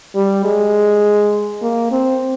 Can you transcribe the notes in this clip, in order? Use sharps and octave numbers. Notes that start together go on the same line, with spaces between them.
G3
G#3
A#3
C4